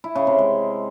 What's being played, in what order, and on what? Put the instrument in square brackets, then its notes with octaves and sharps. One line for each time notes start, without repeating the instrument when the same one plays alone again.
[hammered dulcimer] E4
C#3
C3
G#3